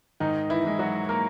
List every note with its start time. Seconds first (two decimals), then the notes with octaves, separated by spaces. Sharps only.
0.20 G#2 D#3 D#4
0.50 E3 E4
0.65 E3 G#3
0.79 F#3 F#4
1.09 A#3 A#4